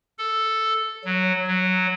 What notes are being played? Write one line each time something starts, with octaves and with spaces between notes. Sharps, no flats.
A4
F#3
F#3